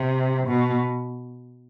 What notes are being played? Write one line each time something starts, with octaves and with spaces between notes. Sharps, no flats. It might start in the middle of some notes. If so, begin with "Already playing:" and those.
Already playing: C3
B2